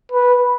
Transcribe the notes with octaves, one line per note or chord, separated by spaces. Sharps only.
B4